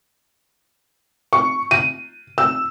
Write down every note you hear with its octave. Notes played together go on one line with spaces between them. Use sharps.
C#6
D#7
E6